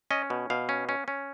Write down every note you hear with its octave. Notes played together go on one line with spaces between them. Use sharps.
C#4 D#5
B2
B2 F5
C#4
C#4
C#4